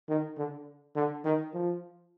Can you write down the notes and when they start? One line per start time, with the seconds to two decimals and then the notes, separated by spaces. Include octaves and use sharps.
0.09 D#3
0.37 D3
0.96 D3
1.24 D#3
1.53 F3